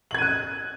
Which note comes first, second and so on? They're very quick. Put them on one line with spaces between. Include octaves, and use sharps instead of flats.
F#7 G#6 D#7 F#6